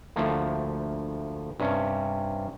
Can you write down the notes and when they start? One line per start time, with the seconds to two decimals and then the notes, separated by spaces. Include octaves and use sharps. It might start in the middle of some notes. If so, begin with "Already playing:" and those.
0.16 D2 F3 A3 A#3
1.60 G2 C3 G3 C#4